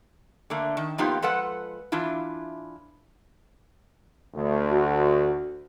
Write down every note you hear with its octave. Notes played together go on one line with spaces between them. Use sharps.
D3 A3 A#3
D#3
F3 A#3 B3 D#4 F4 G4
F3 G#3 A4 B4 F#5
E3 D4 E4 F4
D2
F#4